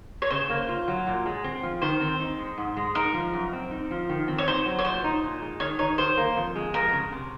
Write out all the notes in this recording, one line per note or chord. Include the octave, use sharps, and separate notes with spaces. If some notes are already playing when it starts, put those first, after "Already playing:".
C#5
C#3 C5
A#3
F4
F#3
A#2
G#3
C4
F3
D#3 C5
C4
D#4
G#3
G#2
G#3
D#4 A#4
F3
F#2
C4
D#4
F3
D#3
C4
C#5
D#4 C5
F#3
C#5
A#2 C5
D#4
A#2
G#3
D#3 C#5
D#4 C#5
D#3 C5
A#3
F2
G#3
F2 A#4
C#3
C3